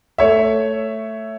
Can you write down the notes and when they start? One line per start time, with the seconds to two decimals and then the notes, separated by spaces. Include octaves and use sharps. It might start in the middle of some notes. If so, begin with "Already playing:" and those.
0.18 A3 C#5 E5